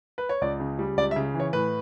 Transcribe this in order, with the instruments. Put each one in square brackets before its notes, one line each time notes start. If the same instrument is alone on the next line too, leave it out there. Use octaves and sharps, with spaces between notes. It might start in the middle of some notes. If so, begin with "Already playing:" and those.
[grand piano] B4
C#5
C#2 D5
C#3
G3
C#2 D5
E5
C#3
E3
C#5
A2 B4